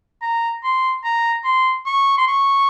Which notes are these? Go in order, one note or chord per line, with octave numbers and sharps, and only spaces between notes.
A#5
C6
A#5
C6
C#6
C6
C#6